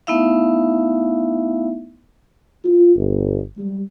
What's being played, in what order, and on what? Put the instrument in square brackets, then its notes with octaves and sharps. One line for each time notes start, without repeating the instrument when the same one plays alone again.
[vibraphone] A3 B3 D#4 E4 E5 F5
[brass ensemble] F4
G1
G3